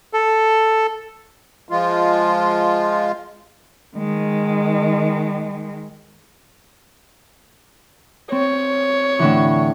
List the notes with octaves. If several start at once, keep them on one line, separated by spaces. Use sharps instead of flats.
A4
F3 G#3 F4
D#3 G#3
C4 C#5
A2 D3 E3